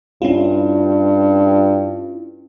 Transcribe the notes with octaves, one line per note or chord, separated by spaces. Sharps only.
G2 C#4 E4 F4